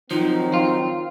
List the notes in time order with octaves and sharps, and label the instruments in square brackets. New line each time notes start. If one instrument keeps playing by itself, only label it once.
[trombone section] D#3 F#3 C4 [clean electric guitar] F3 [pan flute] D#4
[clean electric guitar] F4